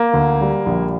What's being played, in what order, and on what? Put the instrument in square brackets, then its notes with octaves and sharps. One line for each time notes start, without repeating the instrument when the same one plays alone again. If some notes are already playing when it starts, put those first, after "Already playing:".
Already playing: [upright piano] A#3
[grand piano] D2
G3
A#1